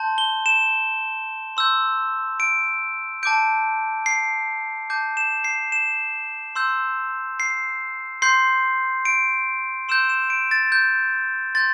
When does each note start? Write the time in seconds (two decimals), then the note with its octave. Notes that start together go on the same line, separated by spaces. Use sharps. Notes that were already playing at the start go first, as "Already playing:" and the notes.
Already playing: A5 C6 G6
0.18 G7
0.46 E7
1.57 C6 E6 G6
2.40 D7
3.23 A5 D6 G6 D7
4.06 C7
4.90 A5 D6 G6
5.17 E7
5.44 C7
5.72 E7
6.55 C6 E6 G6
7.40 C7
8.22 C6 G6 C7
9.05 D7
9.89 C6 E6 G6 E7
10.09 E7
10.30 D7
10.51 A6
10.72 G6
11.55 C6 G6 A6